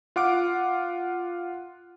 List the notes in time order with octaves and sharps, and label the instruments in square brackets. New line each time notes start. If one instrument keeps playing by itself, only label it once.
[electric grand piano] F4 F#5 D6 D7